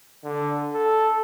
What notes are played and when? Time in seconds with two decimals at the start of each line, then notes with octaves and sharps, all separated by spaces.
0.24 D3
0.74 A4